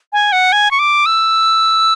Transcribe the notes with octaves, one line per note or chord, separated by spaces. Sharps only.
G#5
F#5
G#5
C#6
D6
E6